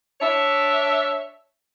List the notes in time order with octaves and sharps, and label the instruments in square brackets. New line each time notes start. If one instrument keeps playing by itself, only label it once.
[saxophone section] D4 C#5 E5